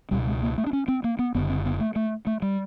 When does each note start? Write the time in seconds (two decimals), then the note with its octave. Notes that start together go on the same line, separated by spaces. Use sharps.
0.11 C#2 B2 G3
0.27 G#3
0.43 A#3
0.58 A3
0.67 D4
0.73 C#4
0.88 C4
1.04 A#3
1.19 B3
1.35 F#1 F#2 D3 B3
1.49 C4
1.65 B3
1.80 A3
1.96 A3
2.27 A3
2.42 G3